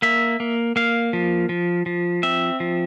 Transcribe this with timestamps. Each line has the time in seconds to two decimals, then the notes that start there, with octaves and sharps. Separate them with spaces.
0.02 A#3 E5
0.40 A#3
0.76 A#3 F5
1.13 F3
1.49 F3
1.86 F3
2.23 C4 E5
2.60 F3